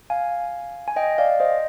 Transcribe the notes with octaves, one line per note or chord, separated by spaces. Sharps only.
F5 G#5
G#5
D#5 G5
D5 F5
C5 D#5